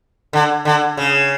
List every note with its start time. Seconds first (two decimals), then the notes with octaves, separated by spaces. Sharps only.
0.33 D3
0.65 D3
0.97 C#3